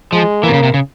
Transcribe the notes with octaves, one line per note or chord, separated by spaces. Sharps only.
F3 G#3
E3 A#3
C3
C#3
C3
C#3